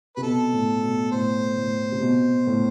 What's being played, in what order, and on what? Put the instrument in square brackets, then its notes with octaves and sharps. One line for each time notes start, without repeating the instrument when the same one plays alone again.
[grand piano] C3 [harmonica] B4
[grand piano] B2 [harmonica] A4
[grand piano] A2
B2
[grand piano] A2 [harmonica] C5
[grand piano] A2
C3
B2
A2